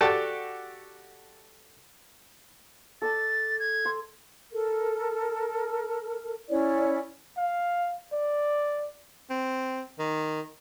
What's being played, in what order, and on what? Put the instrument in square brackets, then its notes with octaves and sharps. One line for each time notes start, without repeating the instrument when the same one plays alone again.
[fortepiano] F#4 G4 A4 D5 A5
[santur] A4 D5 A5 [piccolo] A6
[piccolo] G#6
[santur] C6
[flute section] A4 A#4
C#4 E4 C#5 D5
[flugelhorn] F5
D5
[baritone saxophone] C4
D#3